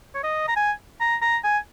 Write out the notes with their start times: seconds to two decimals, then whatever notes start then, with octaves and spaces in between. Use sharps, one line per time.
0.15 C#5
0.24 D#5
0.48 A#5
0.56 G#5
1.01 A#5
1.22 A#5
1.44 G#5